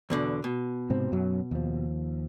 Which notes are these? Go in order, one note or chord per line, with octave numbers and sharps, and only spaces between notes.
E2 B2 D3
B2
G#2 C3 C4
F#2 F#3
D#2 F3